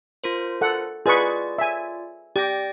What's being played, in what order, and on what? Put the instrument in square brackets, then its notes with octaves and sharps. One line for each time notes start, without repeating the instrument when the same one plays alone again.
[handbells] F4 A#4 C5
[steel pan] A4 F#5
[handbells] F4 D5 [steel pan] G#4 B4 C#6
[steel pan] E5 G#5
[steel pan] G4 [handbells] D5 G5 A#6